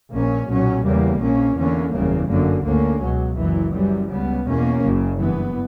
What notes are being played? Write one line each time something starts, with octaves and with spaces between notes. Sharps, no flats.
A#1 A#2 A#3 C#4
B1 A#2 F#3 C#4
E2 C#3 G3 A#3
A#1 A#2 A#3 C#4
E2 D3 A#3 C#4
F#1 E2 C#3 G3 A#3
G1 F#2 D3 A#3
D2 D3 A#3 C#4
C#2 B2 F#3
F#1 F#2 E3
F#2 E3 G3
C#2 C#3 G3 B3
E2 B2 A#3 C#4
F#1 F#2 C#3
G2 E3 B3